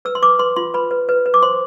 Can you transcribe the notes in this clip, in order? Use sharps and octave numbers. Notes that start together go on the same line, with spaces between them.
B4 E6
C6
B4 D6
B4 C6
F4 C6
B4 B5
B4
B4
B4
D6
C5 C6